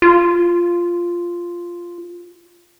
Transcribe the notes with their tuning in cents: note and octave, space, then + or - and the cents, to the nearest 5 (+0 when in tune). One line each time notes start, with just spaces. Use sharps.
F4 -5